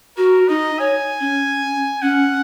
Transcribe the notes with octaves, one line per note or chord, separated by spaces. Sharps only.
F#4 A#4
D#4 D#5
C#5 G#5
C#4
C#4 F#5